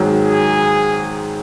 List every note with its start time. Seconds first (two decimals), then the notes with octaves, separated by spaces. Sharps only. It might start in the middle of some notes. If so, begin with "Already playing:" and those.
Already playing: G#2 D#3 F#3
0.21 G#4